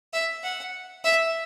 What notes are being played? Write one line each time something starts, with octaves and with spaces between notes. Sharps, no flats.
E5
F#5
E5